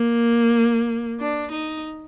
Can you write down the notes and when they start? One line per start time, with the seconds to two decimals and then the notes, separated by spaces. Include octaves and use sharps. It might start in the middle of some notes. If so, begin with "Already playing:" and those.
Already playing: A#3
1.20 D4
1.52 D#4